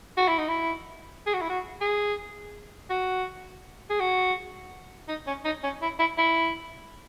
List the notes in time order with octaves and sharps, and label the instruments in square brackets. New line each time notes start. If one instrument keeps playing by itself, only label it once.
[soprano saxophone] F#4
E4
D#4
E4
G#4
F#4
E4
F#4
G#4
F#4
G#4
F#4
D#4
C#4
D#4
C#4
E4
E4
E4